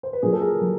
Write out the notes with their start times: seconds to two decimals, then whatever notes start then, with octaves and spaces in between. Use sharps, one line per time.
0.03 C5
0.13 B4
0.22 A#2 F#3 G#4 A#4
0.33 A4
0.42 G#4 A#4
0.61 F#3